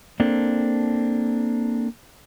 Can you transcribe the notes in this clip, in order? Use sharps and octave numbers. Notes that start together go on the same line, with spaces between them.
A#3 C4 D4 A4